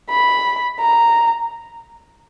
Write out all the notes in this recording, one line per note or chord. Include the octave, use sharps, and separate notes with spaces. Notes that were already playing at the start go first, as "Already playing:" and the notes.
B5
A#5